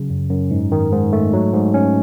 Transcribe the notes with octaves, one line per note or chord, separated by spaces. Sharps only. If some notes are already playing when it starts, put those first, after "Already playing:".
Already playing: C#3 F#3
F#2
F#2
G#2
D#3
G#2
A3
F#3
G#2
C#4